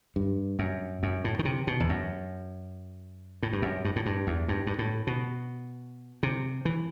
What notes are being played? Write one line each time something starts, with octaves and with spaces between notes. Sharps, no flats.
G2
F#2
F#2
A2
D#3
C3
B2
E2
F#2
A2
G2
F#2
G2
A2
G2
E2
G2
G2
A2
B2
C3
E3